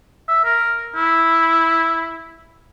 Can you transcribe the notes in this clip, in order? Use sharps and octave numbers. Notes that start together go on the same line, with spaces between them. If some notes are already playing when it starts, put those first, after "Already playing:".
E5
A#4
E4